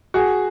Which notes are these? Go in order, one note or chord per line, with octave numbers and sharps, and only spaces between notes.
F#4 G#4